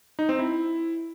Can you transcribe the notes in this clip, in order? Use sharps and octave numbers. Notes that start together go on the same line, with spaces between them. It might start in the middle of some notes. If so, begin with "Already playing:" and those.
D#4
C4
E4